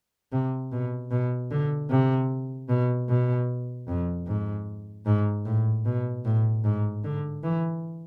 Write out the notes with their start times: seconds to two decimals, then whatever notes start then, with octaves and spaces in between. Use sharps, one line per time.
0.32 C3
0.72 B2
1.11 B2
1.51 D3
1.90 C3
2.69 B2
3.09 B2
3.88 F2
4.27 G#2
5.06 G#2
5.45 A2
5.85 B2
6.25 A2
6.64 G#2
7.04 D3
7.43 E3